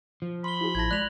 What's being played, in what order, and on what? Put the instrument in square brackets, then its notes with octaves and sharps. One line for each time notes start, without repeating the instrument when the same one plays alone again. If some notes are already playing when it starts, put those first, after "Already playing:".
[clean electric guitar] F3
[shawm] B5 [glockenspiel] C6 G7
[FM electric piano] E4 F#4 G#4
[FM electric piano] A1 E4 A5 [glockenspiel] G#6 A#6
[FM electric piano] G#3 D5 [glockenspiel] F#6 F7 F#7